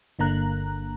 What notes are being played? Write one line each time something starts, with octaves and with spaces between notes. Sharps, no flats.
G1 D3 A#3 A#5 F#6